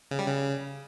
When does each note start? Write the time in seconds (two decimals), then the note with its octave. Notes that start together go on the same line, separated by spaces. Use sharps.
0.11 C#3
0.19 G3
0.26 C#3